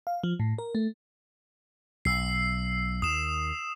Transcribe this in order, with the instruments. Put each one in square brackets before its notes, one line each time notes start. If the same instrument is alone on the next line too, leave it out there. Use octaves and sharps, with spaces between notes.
[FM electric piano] F5
F3
A2
A#4
A3
[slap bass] B1 [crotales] E6 C7
[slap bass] D#2 [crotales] D#6 E7